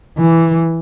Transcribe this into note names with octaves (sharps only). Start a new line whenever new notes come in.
E3